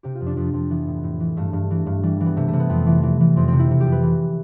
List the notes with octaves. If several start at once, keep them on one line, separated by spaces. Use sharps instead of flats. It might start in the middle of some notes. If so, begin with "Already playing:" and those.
C3 G4
F4
F2
D4
F2 D4
F2 C4
E3 B3
A2
A2
E3
G2 A3
G2
E3
G2
E3 G3
E3
B3
C3 A3
A3
C3
B3
F2
E3
E3
E3
F2 C4
C3 C4
E4
C3
G4
F2
B4
E3